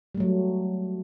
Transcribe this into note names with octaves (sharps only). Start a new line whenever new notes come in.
F#3 G3 A3